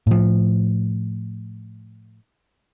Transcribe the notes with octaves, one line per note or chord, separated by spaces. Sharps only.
A2 F3